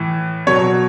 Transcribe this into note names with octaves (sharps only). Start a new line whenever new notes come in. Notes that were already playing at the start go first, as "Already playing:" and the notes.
Already playing: A2 E3
B2 F#3 C#5